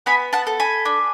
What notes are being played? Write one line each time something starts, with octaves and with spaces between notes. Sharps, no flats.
B3 G#5 B5
F#5 A5
A4
G#5 B5
D4